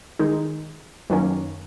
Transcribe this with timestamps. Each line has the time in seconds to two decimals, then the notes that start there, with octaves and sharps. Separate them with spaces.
0.19 D#3 G#3 D#4
1.10 F#2 D#3 A#3 C#4